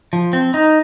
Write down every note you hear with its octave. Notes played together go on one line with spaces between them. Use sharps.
F3
C4
D#4